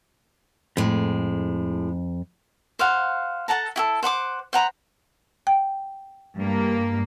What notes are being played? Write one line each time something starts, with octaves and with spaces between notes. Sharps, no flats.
F2 A2 G#3
C5 F5 F#5
A4 F#5 A5 A#5
E4 G4 A4
C5 F#5 B5 D6
C5 F#5 A#5 B5
G5
G2 A#3